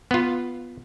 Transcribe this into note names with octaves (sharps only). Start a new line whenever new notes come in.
B3 F4